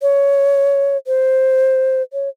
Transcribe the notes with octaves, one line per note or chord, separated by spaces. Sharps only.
C#5
C5
C#5